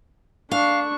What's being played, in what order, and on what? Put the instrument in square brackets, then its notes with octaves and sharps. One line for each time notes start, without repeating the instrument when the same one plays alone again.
[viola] D4 C#6 [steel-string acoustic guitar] F5